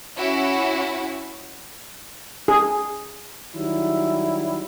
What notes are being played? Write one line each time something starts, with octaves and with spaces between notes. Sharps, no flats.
C#4 E4 F#4
G#4
D#3 F#3 G3 E4